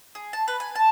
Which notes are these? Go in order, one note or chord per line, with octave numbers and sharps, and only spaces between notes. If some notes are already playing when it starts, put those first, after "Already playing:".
G#4
A5
B4
G#5
A5